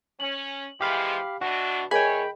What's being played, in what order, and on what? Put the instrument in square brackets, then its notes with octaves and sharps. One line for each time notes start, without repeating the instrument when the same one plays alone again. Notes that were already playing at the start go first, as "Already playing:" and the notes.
[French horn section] C#4 [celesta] F#7
[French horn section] E3 F3 G#3 [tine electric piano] G4 F5 B5
[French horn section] B2 E3 D4 [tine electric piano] F#4
[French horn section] E2 C#5 [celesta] G#4 A#4 D#5 [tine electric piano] G5 B5 [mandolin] G#5